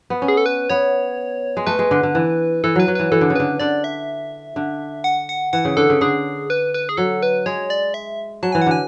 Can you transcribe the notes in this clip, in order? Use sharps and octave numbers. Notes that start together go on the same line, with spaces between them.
B3
C#4
G#4
A4
B4
B3 C#5
G#3
A3 B4
G#3
D3
D3
E3
E3 A4
F#3 B4
F#3
E3 B4
E3 A4
D3
C#3
D3 B4
D3 D5
E5
D3
F#5
F#5
E3 F#5
C#3
D3 A4
C#3
D3 G#4
B4
B4
G#4
F#3 A4
B4
G#3 C#5
D5
E5
F#3 A5
E3 G#5
F#5
D3 G#5